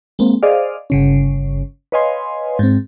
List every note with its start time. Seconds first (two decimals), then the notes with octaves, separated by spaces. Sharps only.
0.19 G#3 A#3 C4
0.43 G#4 C5 D5 D#5 F5
0.90 G1 C#3 C#4
1.92 B4 C#5 D#5 F5 G#5 C6
2.59 G#2 C4